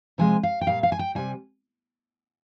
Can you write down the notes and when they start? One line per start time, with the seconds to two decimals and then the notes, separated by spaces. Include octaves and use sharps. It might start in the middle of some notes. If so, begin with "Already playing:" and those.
0.18 C3 F3 G#3 G#5
0.43 F5
0.61 G5
0.67 A#2 G3 F5
0.83 F5
0.92 G#5
0.99 G5
1.15 C3 G3 G#5